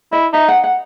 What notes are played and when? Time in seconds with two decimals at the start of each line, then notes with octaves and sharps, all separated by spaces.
0.12 E4 D#5
0.33 D#4 E5
0.48 F#5
0.64 F#5